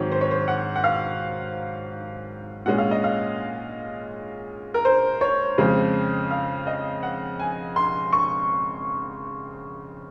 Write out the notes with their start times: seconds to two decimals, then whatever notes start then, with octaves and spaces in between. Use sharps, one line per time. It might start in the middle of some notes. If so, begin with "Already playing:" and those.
Already playing: G#2 D#3 F#3 C4 C#5
0.11 C5
0.21 C#5
0.31 C5
0.48 F#5
0.76 F#5
0.84 F5
2.66 A#2 G#3 C#4 F#5
2.78 F5
2.91 D#5
3.04 F5
4.74 A#4
4.85 C5
5.21 C#5
5.58 F2 C#3 G#3 C4
6.31 F5
6.67 D#5
7.03 F#5
7.39 G#5
7.76 C6
8.13 C#6